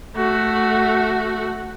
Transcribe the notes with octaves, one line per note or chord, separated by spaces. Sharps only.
A3 F#4